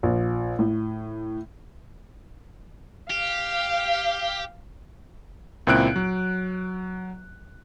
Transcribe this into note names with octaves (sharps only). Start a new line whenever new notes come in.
A#1
A2
G4 F5
C#2 A#2 C4 E4 F#6 D7
F#3